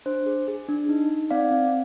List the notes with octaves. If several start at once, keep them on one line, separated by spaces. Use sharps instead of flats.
D4 C5
G#4
G#4
D4
D#4
D#4
C4 D5 F5
C4